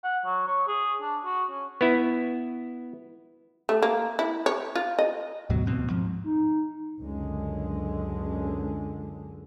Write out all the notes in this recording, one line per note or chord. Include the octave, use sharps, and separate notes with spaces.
F#5
F#3
C#5
G#4
D4
F#4
C#4
B3 E4
A3
A#3
E4
C#5
F4
D#5
D2 G#2 B2 F#3
D1 A1 B2 C4
G#2 F3
D#4
C#2 F#2 D3 G#3